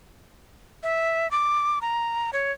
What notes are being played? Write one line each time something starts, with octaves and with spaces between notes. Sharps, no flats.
E5
D6
A#5
C#5